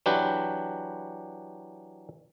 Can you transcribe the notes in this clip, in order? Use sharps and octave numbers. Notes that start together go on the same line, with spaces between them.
E3 F#3 D4 G4 B4